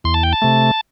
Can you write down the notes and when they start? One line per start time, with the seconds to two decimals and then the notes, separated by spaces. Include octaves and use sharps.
0.04 E2 C6
0.14 A5
0.23 G5
0.33 A5
0.42 C3 A3